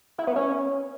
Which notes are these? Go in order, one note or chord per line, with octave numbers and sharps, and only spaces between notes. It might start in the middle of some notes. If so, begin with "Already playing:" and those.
E4
B3
C#4